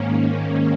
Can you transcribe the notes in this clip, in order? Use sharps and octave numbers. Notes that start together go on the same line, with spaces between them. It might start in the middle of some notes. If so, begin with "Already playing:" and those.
Already playing: G#2 D#3 A#3 C#4